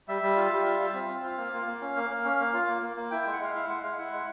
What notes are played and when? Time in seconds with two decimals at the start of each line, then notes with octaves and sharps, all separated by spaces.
0.08 G3 E5
0.22 G3
0.36 F4
0.52 G3
0.65 F4
0.80 F4
0.94 C4
1.09 C4
1.24 F4
1.38 A#3 F5
1.53 A#3
1.67 A#3
1.81 C#4
1.96 A#3
2.10 A#3
2.24 C#4
2.40 A#3
2.53 F4
2.68 A#3
2.82 A#3
2.97 A#3
3.11 E4 G5
3.22 G5
3.26 G#3
3.33 F#5
3.40 G#3 F5
3.55 E4 F5
3.69 G#3 F#5
3.83 G#3 F5
3.98 E4 F#5
4.13 G#3